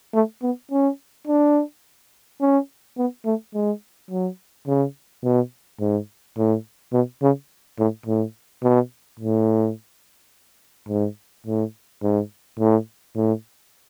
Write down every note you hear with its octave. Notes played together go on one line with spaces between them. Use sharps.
A3
B3
C#4
D4
C#4
B3
A3
G#3
F#3
C#3
B2
G#2
A2
B2
C#3
A2
A2
B2
A2
G#2
A2
G#2
A2
A2